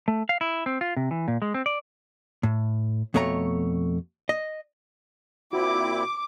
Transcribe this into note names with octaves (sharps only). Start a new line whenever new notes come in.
A3
F5
E4
C4
F4
C3
E3
A#2
G#3
C4
D5
A2
F2 B2 A3 C#5 A#5
D#5
A#2 C4 E4 F#4 D6